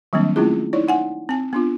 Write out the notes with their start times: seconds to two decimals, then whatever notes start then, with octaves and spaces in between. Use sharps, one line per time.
0.13 D#3 F#3 G3 A#3 C4 D4
0.36 A3 C4 C#4 E4 F4 G#4
0.73 D#4 E4 C#5 D5
0.88 D#4 F#5 G#5
1.29 C4 G#5
1.53 B3 D4 F4